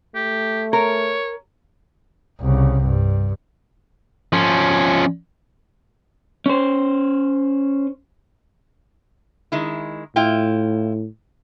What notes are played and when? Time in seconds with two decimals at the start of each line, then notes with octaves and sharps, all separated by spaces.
0.15 A3 G4
0.73 A#4 C#5
2.40 C2 C#3
2.84 G2
4.33 F3 C#4
6.46 C#4 C5
9.52 D#3 G#3 E4
10.16 A2 E4 F4 G5